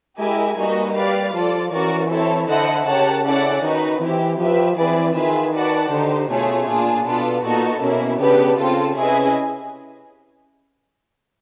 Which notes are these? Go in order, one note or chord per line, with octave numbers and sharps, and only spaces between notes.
G#3 E4 G4 A#4 D#5 G#5
G3 A#3 D#4 F#4 B4 D#5
G4 B4 D5 F5
F3 F4 A4 D5
E3 C#4 F#4 A#4 D5
C4 E4 A4 C#5
D3 E4 A4 C5 D#5 F#5
C#3 G4 A#4 C#5 F#5 A5
C#4 E4 A4 D5 F#5
D#3 D#4 F#4 B4
E3 C4 E4 G4
F3 G4 B4 E5
E3 C4 E4 G#4 B4 D5
D#3 F4 G#4 B4 E5
F#4 B4 D5 F#5 A5
D3 D#4 G4 C5
B2 A3 C#4 F4 G#4 C#5
A#2 D4 F4 G#4
B2 B3 D4 F4 A4
A#2 B3 D#4 F#4 A4
B2 A#3 C#4 E4
C#3 B3 D4 G4 B4
C#3 C4 F4 A4
C3 C#4 E4 G#4 B4 D#5